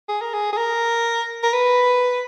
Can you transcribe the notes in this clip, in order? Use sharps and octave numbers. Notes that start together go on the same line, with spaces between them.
G#4
A#4
G#4
G#4
A#4
A#4
B4